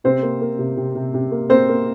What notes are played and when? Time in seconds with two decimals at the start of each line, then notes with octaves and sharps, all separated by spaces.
0.04 C3 C4 C5
0.22 A#3
0.41 A#3
0.59 C3
0.77 C3
0.95 C3
1.14 C3
1.32 A#3
1.50 A#3 C4 C5
1.69 A#3